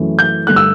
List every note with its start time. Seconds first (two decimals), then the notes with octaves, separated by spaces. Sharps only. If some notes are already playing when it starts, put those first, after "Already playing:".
Already playing: F#2 E3 A3
0.19 G6
0.47 G2 D3 A3 F#6
0.56 E6